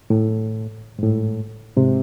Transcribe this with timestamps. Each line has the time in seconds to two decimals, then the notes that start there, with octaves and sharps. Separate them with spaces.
0.10 A2
0.99 G#2
1.03 A2
1.76 G#2 C3